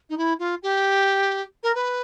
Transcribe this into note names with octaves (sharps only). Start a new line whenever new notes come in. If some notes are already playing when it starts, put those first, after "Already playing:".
D#4
E4
F4
G4
A#4
B4